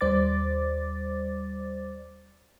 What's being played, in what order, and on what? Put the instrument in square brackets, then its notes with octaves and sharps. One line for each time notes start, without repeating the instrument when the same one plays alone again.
[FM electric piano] D#2 G3 C5 D5 D6 A6